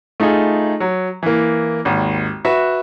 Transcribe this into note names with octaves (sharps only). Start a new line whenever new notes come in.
A3 D#4 F4 G#4
F#3
E3 A#3
G#1 D#2
F#4 B4 E5